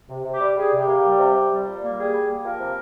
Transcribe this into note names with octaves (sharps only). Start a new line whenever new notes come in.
C3
C3
G4
G3
G3 G#4
C3
G4
A#3
G3
C3
C3
G3
A#2
A#3
G3 G#4
G3
A#3
F3 A#4
C3